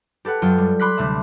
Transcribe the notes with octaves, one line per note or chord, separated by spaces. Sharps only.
G4 A4 B4 F#5
F#2 F#3 F4 G5 D#6
G3
B5 C6 D6 F#6 B6
D2 C3 A3 E5